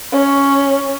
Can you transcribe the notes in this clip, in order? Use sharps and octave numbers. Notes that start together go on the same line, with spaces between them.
C#4 C#5